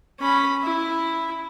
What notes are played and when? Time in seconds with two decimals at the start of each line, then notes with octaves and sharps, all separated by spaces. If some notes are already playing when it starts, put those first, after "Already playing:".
0.19 C#4 B5
0.62 E4